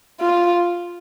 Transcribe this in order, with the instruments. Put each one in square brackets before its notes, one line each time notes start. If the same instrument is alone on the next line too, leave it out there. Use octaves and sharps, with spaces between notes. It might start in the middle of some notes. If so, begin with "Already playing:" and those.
[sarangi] F4